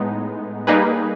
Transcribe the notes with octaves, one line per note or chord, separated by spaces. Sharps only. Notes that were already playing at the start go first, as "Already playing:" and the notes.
Already playing: A2 G#3 B3 D#4
G3 A#3 D#4 G#4 B4